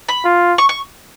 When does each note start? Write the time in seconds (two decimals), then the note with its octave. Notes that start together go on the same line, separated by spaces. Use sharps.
0.08 B5
0.24 F4
0.58 C#6
0.69 C#6